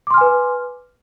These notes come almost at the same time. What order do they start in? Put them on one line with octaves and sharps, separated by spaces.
D6 C6 F6 G#5 B4